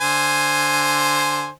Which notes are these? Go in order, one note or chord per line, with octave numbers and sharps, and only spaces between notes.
D3 C5 G#5